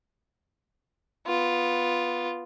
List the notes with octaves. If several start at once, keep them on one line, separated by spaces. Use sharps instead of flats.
B3 F4